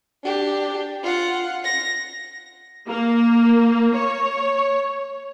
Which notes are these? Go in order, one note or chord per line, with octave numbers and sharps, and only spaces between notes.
D4 G4
F4 F#5
A#6
A#3
C#5